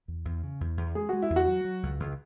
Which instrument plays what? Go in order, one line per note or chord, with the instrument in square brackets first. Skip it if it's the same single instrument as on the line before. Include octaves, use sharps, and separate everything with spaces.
[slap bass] E2
E2
C#3
E2
E2
[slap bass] G#3 [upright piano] G#4
[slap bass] G#3 [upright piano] F#4
[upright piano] E4
[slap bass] E2
[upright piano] F#4
[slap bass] F#3
F#3
C#2
C#2